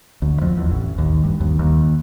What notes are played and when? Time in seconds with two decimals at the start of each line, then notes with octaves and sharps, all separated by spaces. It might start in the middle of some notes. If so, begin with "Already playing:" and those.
0.22 D2
0.42 F2
0.57 E2
0.71 A1
0.98 D#2
1.24 G2
1.41 D#2
1.59 D#2